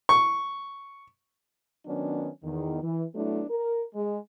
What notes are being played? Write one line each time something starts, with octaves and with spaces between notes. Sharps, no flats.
C#6
D#3 F#3 B3 C#4 D4
E2 D#3
E3
F#3 A3 B3 D4 E4
A#4
G#3